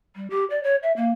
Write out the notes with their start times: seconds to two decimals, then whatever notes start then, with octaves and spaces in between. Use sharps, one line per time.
0.16 G3
0.30 G4
0.50 D5
0.63 C#5
0.83 E5
0.96 A#3